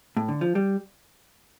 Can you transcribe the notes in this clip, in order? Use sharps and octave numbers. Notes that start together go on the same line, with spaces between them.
A2
D3
F3
G3